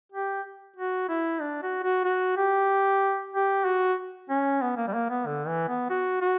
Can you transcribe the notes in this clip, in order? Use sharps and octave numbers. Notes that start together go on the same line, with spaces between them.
G4
F#4
E4
D4
F#4
F#4
F#4
G4
G4
F#4
C#4
B3
A#3
G3
A#3
B3
D3
E3
B3
F#4
F#4